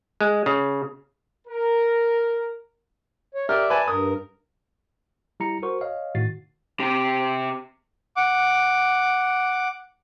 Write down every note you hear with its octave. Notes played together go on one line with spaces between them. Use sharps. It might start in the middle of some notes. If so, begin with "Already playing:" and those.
G#3
C#3
A#4
C#5
G4 A#4 D5 E5 F6
B4 G#5 A5
G2 A#4 D#6
G3 E4 A#5 C#7
F#4 A#4 C5 C#6
C#5 D#5 F5
A2 D#3 F#4 A6 C7
C3 G4
F#5 D6